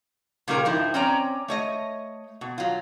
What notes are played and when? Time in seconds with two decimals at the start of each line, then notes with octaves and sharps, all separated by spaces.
0.48 A#2 C#3 G3 A#3 A#4
0.65 G2 F3 D#4 E4
0.94 C4 C#4 D5 A#5
1.48 A3 C#5 D#5
2.41 B2
2.58 F#3 F4